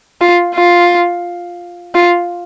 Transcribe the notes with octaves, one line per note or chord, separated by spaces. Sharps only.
F4
F4
F4